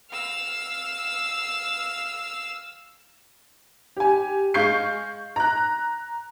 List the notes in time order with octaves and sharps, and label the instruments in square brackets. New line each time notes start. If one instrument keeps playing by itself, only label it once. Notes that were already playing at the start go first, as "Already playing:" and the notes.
[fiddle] F5 E6
[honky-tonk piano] G4 G#5
G#3 F5 C#6 G6 C7
A#5 F#6